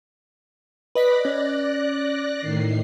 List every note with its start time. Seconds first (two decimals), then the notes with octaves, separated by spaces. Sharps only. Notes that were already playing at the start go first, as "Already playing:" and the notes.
0.95 B4 D5 D#5 F#6 A#6 B6
1.25 C#4
2.40 A2 D#3 C7